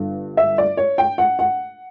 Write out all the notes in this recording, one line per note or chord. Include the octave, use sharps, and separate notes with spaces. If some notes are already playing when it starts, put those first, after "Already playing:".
Already playing: G1 G2 D3
E5
D5
C#5
G5
F#5
F#5